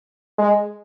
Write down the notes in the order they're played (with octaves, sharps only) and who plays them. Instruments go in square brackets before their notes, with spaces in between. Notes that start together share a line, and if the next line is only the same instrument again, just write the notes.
[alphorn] G#3